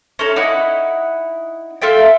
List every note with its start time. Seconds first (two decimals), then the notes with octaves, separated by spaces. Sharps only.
0.19 C#4 D#4 A4 C#5
0.36 D#4 E4 F#5 B5
1.82 F4 A4 E5 G5